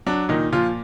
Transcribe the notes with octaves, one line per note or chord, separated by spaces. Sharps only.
F#3 D4
A#2 D#3 D#4
A#2 F3 F4